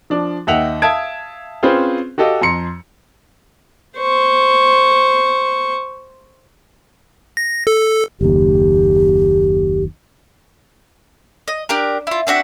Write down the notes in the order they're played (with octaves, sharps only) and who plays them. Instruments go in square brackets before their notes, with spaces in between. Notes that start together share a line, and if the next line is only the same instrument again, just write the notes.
[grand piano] F3 D4
D#2 D#4 E5 F#5 G5 F7
E5 F5 A5 D#6 G#6 D7
C4 C#4 F4 G#4 B4 C5
F#4 G4 A4 D#5 F5 G5
F2 A#5 C6 C#7
[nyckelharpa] C5 C#6
[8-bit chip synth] A#6
A4
[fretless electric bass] F#1 D#2 [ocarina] G4
[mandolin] D#5
D4 G4 A#4
E4 F4
C4 D4 F#4 E5